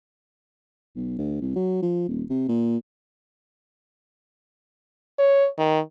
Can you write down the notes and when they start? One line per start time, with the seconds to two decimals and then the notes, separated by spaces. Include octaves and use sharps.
0.95 B1
1.18 D2
1.41 C2
1.55 F#3
1.82 F3
2.08 D#1
2.30 C3
2.48 A#2
5.19 C#5
5.58 D#3